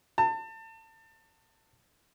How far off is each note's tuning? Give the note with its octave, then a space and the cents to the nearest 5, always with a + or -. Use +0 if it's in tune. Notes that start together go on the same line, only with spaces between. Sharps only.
A5 +30